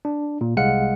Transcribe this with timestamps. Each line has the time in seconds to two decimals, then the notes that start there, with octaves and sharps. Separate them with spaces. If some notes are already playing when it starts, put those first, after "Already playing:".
0.05 D4
0.41 A#2
0.57 C2 G#3 F5 F#5 C#7